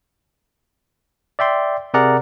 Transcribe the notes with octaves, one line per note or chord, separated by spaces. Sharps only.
D5 E5 G5 C6
C3 G#4 A#4 D5 F#5 A#5